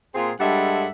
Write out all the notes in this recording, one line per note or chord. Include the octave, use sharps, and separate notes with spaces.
A#2 C4 F4 G#4
G2 G3 G#3 A4 E5 F#5